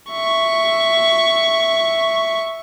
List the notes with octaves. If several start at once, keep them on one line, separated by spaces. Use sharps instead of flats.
E5 C#6